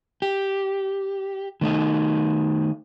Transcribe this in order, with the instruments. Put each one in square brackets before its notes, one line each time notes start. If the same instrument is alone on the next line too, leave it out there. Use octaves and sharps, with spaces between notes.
[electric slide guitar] G4
D#3 A3 D#4